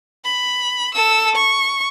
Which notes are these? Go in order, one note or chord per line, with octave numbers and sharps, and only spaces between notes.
B5
A4 E6
C#6